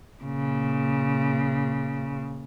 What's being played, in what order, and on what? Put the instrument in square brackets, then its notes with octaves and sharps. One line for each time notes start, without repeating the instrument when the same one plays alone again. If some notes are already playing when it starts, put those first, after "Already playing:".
[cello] A#2 C#3